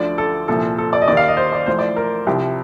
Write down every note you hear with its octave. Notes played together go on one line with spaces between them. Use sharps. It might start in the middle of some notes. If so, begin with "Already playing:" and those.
Already playing: D2 D3 F3 D5
A4
C2 A#2 F3 A4
A4
D5
D#5
D#2 D#3 D5
F5
D#5
C5
D5
A1 A2 F3 C5
D5
A#4
C2 C3 F3 G4